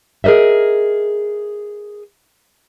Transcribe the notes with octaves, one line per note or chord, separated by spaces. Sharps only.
G#4 A#4 C5 D#5 E5